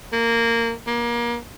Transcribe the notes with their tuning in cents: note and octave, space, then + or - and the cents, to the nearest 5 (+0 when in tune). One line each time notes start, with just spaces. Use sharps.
A#3 -15
A#3 +30